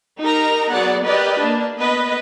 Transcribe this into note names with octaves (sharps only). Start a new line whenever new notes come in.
D#4 G4 A#4 A#5
F#3 B3 G#4 D5 F#5
G4 A#4 B4 D5 D#5
A#3 D4
B3 B4 D#5